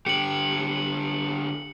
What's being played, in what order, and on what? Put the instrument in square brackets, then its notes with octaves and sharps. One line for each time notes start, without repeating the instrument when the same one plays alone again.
[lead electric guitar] D3 G4 [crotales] C#7 F#7